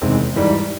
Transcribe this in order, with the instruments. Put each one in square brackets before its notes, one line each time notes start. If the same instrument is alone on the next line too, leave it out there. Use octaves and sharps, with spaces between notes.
[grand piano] E2 C3 D#3 G#3 C4
G#2 E3 G3